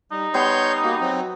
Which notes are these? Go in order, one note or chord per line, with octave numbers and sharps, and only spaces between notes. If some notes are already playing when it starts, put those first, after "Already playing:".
G3 D#4
G3 B3 C#5 C6 G6
A#3 F#4
F#3 C4